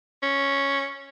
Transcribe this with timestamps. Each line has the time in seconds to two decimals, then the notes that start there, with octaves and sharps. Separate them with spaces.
0.22 C#4